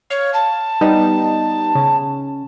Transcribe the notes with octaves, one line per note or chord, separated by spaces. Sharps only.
C#5 F5
A5
G3 B3 D#4
C#3